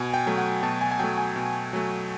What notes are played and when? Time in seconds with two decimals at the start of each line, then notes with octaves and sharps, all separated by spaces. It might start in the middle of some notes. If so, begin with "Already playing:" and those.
Already playing: B2 G#5
0.14 G5
0.26 F#3 A3
0.38 F#5
0.63 B2 A5
0.81 G#5
0.91 G#5
1.00 F#3 A3 G5
1.18 G#5
1.36 B2
1.73 F#3 A3